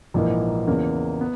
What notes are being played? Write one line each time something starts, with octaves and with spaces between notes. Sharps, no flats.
A#1 G#2 E3 A#3
E2 C#3 E3 A#3
B3